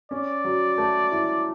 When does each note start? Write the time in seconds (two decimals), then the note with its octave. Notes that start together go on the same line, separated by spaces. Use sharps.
0.11 C#4 D5
0.44 F#3
0.78 A3
1.12 E4